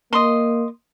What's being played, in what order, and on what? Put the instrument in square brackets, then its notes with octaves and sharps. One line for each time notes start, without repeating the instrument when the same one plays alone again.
[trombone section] A#3 [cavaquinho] D#5 C6